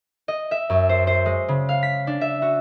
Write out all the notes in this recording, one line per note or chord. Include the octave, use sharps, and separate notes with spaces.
D#5
E5
F#2
C5
C5
G#3
C#3
F5
B6
D4
E5
F#4